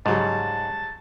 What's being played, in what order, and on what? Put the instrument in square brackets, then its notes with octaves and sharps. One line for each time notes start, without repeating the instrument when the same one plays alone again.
[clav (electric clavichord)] G#2 [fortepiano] C#3 F#3 G3 [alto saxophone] A5